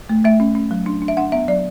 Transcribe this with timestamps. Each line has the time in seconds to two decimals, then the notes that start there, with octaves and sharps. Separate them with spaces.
0.09 A3
0.24 A3 E5
0.40 C#4
0.55 C#4
0.71 F#3
0.86 D4
1.02 D4
1.08 E5
1.17 D4 F#5
1.32 B3 E5
1.48 F#3 D5